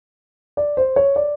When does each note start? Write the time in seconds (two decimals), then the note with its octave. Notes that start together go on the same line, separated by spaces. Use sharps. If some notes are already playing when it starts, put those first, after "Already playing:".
0.57 D5
0.77 C5
0.96 C#5
1.16 D5